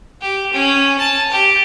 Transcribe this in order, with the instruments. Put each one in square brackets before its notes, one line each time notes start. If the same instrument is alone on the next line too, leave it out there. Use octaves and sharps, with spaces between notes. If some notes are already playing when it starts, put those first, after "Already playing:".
[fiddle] G4
C#4
A5
G4